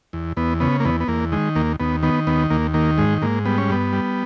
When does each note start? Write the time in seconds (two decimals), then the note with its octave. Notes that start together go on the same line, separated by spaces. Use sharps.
0.13 E2
0.37 E2 B3
0.60 C#3 B3
0.80 A#3
0.85 E2 B3
1.00 B3
1.08 E2 A#3
1.32 D#3 G#3
1.55 D#2 A#3
1.80 D#2 B3
2.03 D#3 B3
2.27 D#2 B3
2.51 D#2 A#3
2.74 D#3 A#3
2.98 G#2 G#3
3.22 G#2 A#3
3.45 G3 B3
3.58 C#4
3.70 G2 B3
3.93 G3